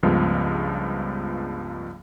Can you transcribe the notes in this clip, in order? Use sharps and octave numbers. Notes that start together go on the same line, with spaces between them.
C#2 G2 F3 G#3 A3 B3